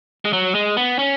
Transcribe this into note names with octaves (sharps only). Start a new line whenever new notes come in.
G#3
F#3
G#3
B3
C#4